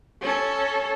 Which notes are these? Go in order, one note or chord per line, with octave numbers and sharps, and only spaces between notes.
C#4 A4